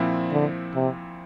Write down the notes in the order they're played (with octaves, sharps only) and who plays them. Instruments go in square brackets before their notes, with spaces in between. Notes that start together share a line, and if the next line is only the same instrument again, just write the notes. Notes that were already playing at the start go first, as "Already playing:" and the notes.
Already playing: [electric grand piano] A#2 F3 C4 E4
[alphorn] D3
C3